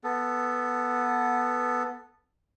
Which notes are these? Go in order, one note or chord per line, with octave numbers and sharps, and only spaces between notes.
B3 A4